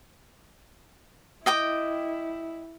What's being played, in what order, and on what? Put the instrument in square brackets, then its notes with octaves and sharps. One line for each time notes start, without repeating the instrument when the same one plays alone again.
[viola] E4 [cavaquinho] D#5 G5 D6